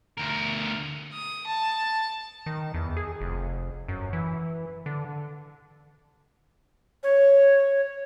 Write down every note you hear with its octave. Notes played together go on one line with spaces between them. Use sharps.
D2 A#4
D#6
A5
D#3
E2
G#4
F1
F#2
E3
D3
C#5